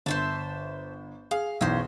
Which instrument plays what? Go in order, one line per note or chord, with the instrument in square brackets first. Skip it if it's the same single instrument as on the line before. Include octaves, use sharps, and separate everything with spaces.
[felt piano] G1 [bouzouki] C5 E5 A5
[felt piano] G#4 [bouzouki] F5
[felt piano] B1 E2 [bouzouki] C#4 C5